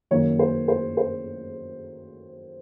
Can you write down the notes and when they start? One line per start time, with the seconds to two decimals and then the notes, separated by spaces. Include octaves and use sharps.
0.11 F#2 D#3 A#3 C#4 C#5
0.39 C5
0.68 C5
0.97 C5